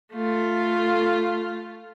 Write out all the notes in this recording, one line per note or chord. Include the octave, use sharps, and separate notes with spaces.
A3 F4